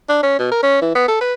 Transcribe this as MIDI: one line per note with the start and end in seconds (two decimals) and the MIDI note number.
0.09 0.19 62
0.23 0.36 61
0.39 0.48 47
0.52 0.62 70
0.63 0.78 61
0.82 0.92 52
0.95 1.07 59
1.08 1.19 69
1.21 1.33 71